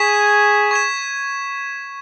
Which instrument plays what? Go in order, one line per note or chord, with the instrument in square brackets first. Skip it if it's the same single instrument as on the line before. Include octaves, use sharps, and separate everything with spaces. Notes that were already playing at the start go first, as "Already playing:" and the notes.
Already playing: [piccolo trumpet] G#4 [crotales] C#6 G#6 B6 E7
[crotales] C#6 G#6 B6 E7